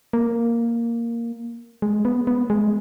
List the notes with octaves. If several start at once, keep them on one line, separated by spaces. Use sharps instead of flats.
A#3
G#3
B3
B3
G#3